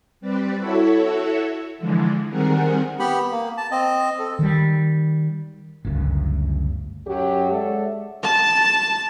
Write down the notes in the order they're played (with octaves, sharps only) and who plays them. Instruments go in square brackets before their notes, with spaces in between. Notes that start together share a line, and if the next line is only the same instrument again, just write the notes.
[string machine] G3 C4 B4 D5
E4 F#4 A4 C#5 E5
D3 E3 F3 G#3
D#3 G3 C4 G#4 A#4 F#5
[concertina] B3 G4 B5
A#3
A5
C4 D#5
A4
[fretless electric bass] D#3 G3
G1 C#2 F#2 A3
[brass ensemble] F#2 F#3 G4
G#3 A4 C#5 D5 E5 F#5
[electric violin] A5